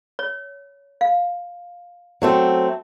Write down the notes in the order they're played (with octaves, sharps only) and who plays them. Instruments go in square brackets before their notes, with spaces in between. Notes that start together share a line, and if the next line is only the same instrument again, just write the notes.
[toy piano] C#5
F5
[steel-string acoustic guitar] F#3 A3 C4